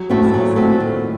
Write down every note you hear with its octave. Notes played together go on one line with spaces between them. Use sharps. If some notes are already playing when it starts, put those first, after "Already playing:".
Already playing: F#3
A2 A3 C4 F#4
A2
A#2 F#3
A3 C4 F#4
D#3